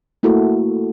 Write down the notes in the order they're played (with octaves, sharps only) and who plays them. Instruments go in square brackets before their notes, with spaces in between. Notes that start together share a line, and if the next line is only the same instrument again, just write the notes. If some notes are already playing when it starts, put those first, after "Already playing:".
[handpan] A3 A#3 E4 F#4 A4